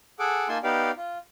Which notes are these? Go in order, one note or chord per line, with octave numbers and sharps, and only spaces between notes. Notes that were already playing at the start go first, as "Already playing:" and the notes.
G#4 A4 F#5 D6
A#3 D#4 F4 G#5 A5 C6
B3 D#4 G4 D5 F5
F4